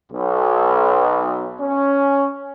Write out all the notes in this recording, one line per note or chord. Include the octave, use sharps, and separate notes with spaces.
B1
C#4